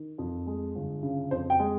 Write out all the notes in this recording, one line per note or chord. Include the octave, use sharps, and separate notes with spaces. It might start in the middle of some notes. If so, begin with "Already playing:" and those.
Already playing: D#3
F2
G#3
G1
C#3
F2 C5
G5
G#3